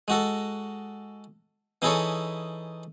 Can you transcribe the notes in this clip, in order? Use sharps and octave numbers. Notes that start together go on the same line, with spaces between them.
G#3 F#4 A4
E3 D#4 E4 G#4 A4 C#5